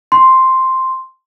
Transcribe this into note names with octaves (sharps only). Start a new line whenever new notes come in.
C6